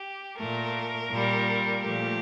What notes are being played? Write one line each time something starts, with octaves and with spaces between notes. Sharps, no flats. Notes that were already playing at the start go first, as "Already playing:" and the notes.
Already playing: G4
A#2 A3 A#4
A#2 G3
A#2 F3 A3 G4